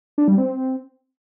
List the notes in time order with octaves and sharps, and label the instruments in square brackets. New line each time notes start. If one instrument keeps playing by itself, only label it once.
[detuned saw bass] D4
G3
C4